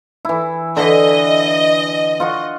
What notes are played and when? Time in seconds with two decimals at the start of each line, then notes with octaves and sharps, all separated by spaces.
0.25 E3 E4
0.77 D3 E3 D#5
2.20 F4 F#5 C#6